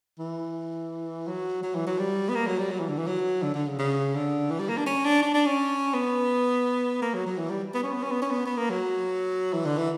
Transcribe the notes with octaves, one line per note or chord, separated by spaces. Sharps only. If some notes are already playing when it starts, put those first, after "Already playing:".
E3
F#3
F#3
E3
F#3
G3
B3
A#3
F#3
G3
F#3
E3
D3
E3
F#3
D3
D3
C#3
C#3
D3
E3
G3
A#3
D4
C#4
D4
D4
D4
C#4
B3
A#3
F#3
F#3
E3
G3
B3
C#4
B3
C#4
B3
C#4
B3
B3
A#3
F#3
E3
D3
E3